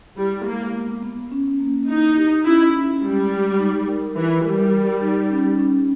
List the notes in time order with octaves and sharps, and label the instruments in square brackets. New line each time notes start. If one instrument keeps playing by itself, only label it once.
[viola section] G3 [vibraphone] E4
[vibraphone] G#3 [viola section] A#3
[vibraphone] B3
B3
C#4
A#3
[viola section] D#4 [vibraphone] E4
[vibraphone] G4
[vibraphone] C#4 [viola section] E4
[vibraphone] C#4
[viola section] G3 [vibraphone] G#3
[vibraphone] G#3
D#4
A#4
[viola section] E3 [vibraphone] E4
[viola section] G3 [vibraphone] A#4
[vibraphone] G4
D#4
C#4
C#4